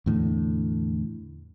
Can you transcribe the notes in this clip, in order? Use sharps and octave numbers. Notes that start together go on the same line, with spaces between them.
E2 A2 D3